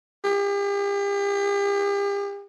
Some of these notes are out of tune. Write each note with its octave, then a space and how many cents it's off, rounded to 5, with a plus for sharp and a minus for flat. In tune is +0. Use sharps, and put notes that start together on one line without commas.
G4 +40